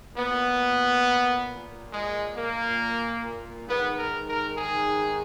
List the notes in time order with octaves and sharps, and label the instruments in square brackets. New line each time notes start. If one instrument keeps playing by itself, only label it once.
[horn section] A#2 B3
G#3
A#3
G#2 D#3 B3
A#4
A#4
G#4